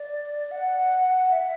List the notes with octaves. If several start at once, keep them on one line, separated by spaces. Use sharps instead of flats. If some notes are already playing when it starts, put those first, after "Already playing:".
Already playing: D5
F#5
E5